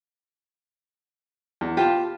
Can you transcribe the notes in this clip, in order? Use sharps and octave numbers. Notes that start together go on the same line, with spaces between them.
E2
F4 G4 B4 A5